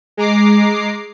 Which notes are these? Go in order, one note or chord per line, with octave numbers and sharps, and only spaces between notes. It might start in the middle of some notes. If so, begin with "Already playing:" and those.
G#3 A#5 D6 C7